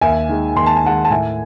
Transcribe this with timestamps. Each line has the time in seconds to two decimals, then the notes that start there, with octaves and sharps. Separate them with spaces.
0.01 D#2 E5 G#5
0.29 D#3 G#3
0.56 D#2 C6
0.66 A5
0.76 G#5
0.83 D#3 G#3 F#5 A5
1.05 A5
1.10 A2 E5 G#5